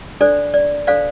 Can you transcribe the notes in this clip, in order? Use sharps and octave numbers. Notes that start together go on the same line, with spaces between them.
D4 A4 C5 D5
D5
D4 A4 C5 D5 F5